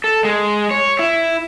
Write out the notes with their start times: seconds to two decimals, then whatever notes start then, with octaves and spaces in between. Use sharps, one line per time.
0.04 A4
0.25 G#3
0.71 C#5
0.99 E4